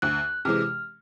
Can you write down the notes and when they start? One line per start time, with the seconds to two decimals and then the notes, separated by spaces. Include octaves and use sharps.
0.02 D2 F#6
0.45 C3 E3 G#3 F6